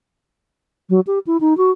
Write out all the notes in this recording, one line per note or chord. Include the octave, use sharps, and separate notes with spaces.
F#3
G4
E4
D#4
F#4